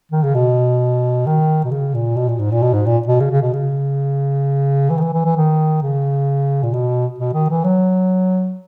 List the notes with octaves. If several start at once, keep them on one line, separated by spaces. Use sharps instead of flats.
D#3
C#3
B2
D#3
B2
C#3
A#2
B2
A#2
G#2
A#2
B2
G#2
A#2
B2
C#3
C#3
B2
C#3
E3
D#3
E3
E3
E3
D#3
C#3
A#2
B2
B2
D#3
E3
F#3